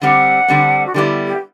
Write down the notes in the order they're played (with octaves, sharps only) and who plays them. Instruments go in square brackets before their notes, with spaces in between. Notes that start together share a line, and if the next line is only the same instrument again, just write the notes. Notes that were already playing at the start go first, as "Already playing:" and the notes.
[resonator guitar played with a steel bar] D3 G3 C4 [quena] F#5
[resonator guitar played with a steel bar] D3 G3 C4
[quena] F#4
[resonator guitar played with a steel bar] D3 G3 B3 E4 [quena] G4
[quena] G4